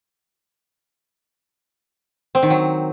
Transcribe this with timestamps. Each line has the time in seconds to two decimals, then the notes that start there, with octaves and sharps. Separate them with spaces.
2.35 C4
2.43 D#3
2.50 F#3